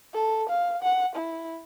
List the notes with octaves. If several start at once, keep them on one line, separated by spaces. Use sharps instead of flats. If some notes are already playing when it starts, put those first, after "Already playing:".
A4
F5
F#5
E4